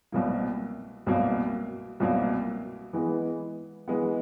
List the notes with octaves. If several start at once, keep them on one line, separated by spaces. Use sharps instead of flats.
C2 B2 F#3 A#3
C2 B2 F#3 A#3
C2 B2 F#3 A#3
E3 G#3 B3
E3 G#3 B3